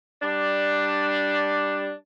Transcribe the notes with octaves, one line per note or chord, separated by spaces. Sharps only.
G3 D4